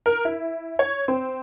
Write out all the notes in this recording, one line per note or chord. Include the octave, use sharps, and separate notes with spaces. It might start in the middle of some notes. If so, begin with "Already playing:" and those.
A#4
E4
C#5
C4